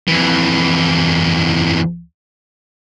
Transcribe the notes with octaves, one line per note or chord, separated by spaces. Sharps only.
F2 E3